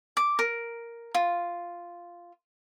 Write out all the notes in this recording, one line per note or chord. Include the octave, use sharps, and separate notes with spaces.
D6
A#4
F4